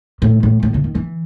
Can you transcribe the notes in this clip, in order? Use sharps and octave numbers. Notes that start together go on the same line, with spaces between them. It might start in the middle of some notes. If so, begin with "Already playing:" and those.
A2
A2
A2
C#3
D#3
E3